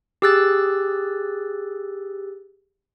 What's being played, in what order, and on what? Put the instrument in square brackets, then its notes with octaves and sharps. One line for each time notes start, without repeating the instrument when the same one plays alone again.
[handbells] G4 G#4 E6 F#6 A6